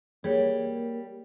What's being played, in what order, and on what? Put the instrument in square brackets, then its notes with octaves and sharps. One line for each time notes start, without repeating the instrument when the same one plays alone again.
[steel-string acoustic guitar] G3 [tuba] A#3 [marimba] G#4 C#5